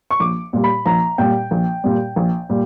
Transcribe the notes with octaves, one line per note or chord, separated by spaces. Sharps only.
C#6
A#1 D6
A#2 G3
B5
A#1 A#5
A#2 G3 G5
A#1
A#2 G3
A#1
A#2 G3